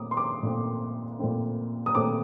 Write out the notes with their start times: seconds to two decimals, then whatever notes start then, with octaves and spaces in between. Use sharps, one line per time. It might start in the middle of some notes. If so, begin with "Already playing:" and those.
Already playing: A#2 A3 C4 D6 D#6
0.11 C6
0.17 D6
0.43 A#2 A3 C4
1.19 A#2 A3 C4
1.86 D#6
1.95 A#2 A3 C4 D6